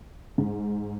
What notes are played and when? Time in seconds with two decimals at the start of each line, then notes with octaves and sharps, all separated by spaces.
0.38 G#2